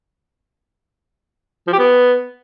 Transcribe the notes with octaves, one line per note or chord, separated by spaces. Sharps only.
F3
G4
B3